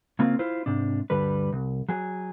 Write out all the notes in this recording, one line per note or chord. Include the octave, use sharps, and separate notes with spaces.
C#3 A#3 C4 F4
E4 F4 C5
G#2 C3 D4
D2 G2 D3 G3 B4
C2
F#3 G#4